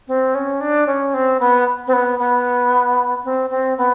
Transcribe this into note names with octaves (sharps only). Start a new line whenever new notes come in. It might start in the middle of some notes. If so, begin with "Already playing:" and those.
C4
C#4
D4
C#4
C4
B3
C4
B3
B3
C4
C4
B3